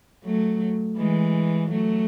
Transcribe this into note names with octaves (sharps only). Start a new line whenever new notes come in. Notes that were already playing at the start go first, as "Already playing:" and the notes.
F#3 A3
E3 G#3
F#3 A3